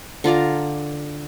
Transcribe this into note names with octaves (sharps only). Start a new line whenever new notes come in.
D3 F4 D5 A#5